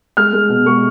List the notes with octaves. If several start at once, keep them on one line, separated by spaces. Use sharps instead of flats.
G#3 F6
G#3
B2
G#3 C#6